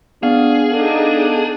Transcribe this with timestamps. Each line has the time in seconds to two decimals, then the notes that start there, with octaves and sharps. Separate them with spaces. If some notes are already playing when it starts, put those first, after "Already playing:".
0.23 B3 D4 G#4 F5
0.73 D4 D#4 A4